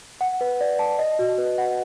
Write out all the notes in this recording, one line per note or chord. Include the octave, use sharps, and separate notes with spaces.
F#5
B4
D5
A5
D#5
F#4
B4
F#5